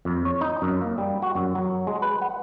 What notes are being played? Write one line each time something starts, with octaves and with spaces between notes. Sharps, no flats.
F2
C#5
D#4
F#2
A#3
G3
F#4
F#2
F#3
G#3
B4
F#5